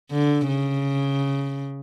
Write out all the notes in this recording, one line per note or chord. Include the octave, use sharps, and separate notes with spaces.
D3
C#3